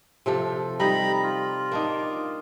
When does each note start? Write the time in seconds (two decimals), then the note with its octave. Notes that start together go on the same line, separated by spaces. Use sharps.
0.26 C3 F3 A4
0.80 G3 D#4 A#5 B5
1.23 F4
1.71 A#3 D4 D#4